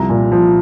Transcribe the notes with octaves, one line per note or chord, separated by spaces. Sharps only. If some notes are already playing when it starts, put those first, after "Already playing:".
Already playing: C2 F3 A#5
A#2
F3